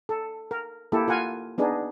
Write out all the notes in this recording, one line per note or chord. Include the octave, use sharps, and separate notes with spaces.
A4
A#4
A#3 E4 G4 A4
F4 A#4 F#5 G#5
B3 D4 D#4 G#4